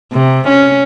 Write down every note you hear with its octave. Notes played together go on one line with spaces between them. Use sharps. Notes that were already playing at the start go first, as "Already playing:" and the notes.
C3
C#4